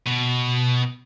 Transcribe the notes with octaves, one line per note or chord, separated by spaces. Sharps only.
B2